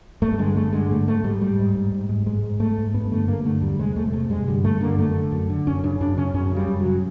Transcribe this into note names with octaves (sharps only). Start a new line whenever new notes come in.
G2 A3
D3 G#3
G2 A3
D3 G#3
G#2 A3
G#2 A3
G#2 G3
G#2 G3
G#2
G#2
G#2
G#2
G#2 G#3
G#2
G#2 A3
G#2
G2 B3
D3 A3
G2 A#3
D3 A3
E2 G3
C3 G#3
E2 A3
G#3
C3 A3
G2 G#3
D3 G3
G2 A3
D3 A#3
F#2 A3
D3
F#2
D3
F#2 C#4
C#3 D4
F#2 D4
C#3 C#4
F#2 C#4
C#3
G3
F#2
F#3
C#3